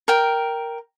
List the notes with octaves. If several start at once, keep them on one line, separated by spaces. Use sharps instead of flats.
A#4 G5